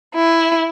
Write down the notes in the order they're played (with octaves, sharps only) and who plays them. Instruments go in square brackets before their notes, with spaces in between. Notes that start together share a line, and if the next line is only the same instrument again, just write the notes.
[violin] E4